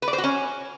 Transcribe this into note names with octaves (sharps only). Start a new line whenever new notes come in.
B4
D5
C5
F#4
C#4